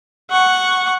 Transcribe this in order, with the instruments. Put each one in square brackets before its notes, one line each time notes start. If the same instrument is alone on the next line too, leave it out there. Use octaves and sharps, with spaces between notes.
[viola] F#5 C#6